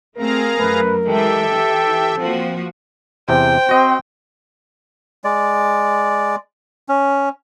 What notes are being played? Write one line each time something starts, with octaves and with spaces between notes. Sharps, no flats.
A3 C4 G#4 A#4 F5 A#5
F#2 A3 B4
E3 G#3 G4 A4 E5 G5
E3
F3 A#3 C4 F#4
E2 C3 C5 G5
C4 F#4 D#5
G#3 D5
C#4